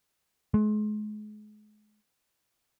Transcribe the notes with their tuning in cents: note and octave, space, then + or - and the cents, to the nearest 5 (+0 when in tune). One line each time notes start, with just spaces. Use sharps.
G#3 +35